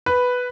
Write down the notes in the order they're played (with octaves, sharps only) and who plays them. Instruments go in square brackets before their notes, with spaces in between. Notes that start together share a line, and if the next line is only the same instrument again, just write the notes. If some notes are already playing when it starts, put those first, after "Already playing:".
[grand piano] B4